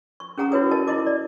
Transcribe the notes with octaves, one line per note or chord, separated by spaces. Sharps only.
C#6
C#4 G#4 F#5 A#5 D#6
E4 F#4 B4 C#5 D#6
A#4 D#5 A5
E4 A#4 D#5 D6
D5